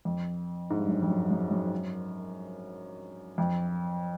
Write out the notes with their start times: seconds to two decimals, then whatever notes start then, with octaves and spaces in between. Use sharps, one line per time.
0.05 F2
0.70 G#2
0.79 G2
0.88 F#2
1.02 F2
1.10 F#2
1.31 F#2
1.51 F#2
3.38 F2